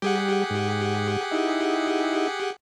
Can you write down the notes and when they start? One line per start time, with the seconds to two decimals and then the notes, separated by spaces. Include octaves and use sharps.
0.02 G3 G4 G#4 F#5
0.50 G#2
1.31 D#4 E4